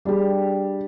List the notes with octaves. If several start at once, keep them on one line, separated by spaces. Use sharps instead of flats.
G3 D4 G4 G#4